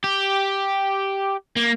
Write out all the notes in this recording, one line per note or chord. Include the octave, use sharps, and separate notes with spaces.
G4
A#3